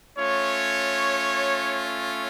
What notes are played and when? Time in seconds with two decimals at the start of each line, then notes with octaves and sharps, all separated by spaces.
0.17 A3 C#4 F4 C#5
1.85 C#5